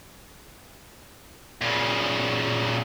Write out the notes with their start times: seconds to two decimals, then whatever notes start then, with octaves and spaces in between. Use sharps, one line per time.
1.62 A#2 C#3